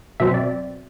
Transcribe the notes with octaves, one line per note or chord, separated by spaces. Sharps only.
B2 F#3 C4 E5
D5